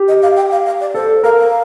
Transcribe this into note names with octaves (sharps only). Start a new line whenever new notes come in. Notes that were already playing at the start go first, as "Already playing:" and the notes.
Already playing: G4
D#5
F5
G5
F5
F5
D5
A4 C5
A#4 F5
F5